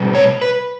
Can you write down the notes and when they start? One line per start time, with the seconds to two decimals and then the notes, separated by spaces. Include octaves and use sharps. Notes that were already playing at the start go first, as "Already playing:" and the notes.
Already playing: B2 G3
0.15 C#5
0.42 B4